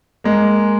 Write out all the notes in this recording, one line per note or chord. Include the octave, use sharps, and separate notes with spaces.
G#3 A#3